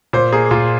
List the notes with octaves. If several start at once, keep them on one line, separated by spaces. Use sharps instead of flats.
A#2 C5
A#3 G#4
A#2 F4